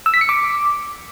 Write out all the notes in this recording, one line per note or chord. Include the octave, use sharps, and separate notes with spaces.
E6
B6
C#7
D6